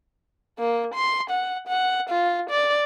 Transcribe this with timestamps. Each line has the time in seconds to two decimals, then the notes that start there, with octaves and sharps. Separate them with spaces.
0.59 A#3
0.95 C6
1.30 F#5
1.68 F#5
2.10 F4
2.50 D5